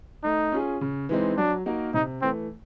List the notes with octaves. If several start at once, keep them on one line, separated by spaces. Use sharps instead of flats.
A3 D#4
C#4 F4 G#4
C#3
E3 G#3 C4 D#4
F#3 D4
A#3 D#4 F#4 A#4
C3 D#4
E3 A3 C4